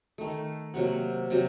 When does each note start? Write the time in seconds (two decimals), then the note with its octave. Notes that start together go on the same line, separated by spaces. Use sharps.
0.18 D#3 A3
0.74 C3 F#3 A#3 F#5
1.30 C3 F#3